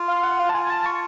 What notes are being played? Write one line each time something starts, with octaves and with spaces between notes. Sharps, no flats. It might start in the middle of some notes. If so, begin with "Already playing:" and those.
Already playing: F4
F5
F#5
F5
A5
F4 G#5
G#5
A5
C#6